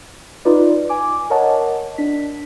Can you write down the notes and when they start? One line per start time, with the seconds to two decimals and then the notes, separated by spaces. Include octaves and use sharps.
0.45 D#4 F4 B4 D5
0.89 G#5 D6
1.30 A#4 C#5 D#5 F#5 A5
1.98 D4 B6